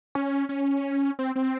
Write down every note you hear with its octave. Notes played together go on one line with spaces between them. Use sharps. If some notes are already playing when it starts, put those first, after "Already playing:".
C#4
C#4
C4
C4